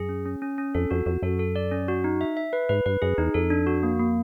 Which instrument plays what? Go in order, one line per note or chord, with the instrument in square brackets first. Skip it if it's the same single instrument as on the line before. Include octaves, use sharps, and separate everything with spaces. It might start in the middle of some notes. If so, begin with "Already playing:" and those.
Already playing: [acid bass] F#2 [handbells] G#4
[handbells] C#4
C#4
C#4
C#4
[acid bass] F2 [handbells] A4
[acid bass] F2 [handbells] F#4
[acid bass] F2 [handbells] F#4
[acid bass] F#2 [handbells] A4
[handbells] A4
D5
C#4
F#4
D#4
E5
E5
B4
[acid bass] G#2 [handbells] B4
[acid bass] G2 [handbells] B4
[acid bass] F#2 [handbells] G#4
[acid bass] E2 [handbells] D#4
[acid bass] F2 [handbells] A4
[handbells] D4
F#4
A#3
A#3